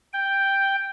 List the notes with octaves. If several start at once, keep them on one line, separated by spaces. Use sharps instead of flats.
G5